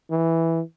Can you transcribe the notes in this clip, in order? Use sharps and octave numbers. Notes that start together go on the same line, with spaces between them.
E3